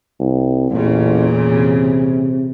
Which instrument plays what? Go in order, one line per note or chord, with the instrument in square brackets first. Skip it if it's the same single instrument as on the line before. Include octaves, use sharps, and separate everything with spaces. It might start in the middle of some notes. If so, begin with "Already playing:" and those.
[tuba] C2
[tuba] A1 [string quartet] E2 A#2 C#3
[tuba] C3